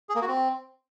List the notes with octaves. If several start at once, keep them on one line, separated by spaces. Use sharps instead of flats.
G#4
A#3
F#4
C4